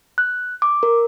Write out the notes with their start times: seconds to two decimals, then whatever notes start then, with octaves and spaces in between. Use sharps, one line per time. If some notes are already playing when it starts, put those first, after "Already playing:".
0.18 F#6
0.62 D6
0.83 A#4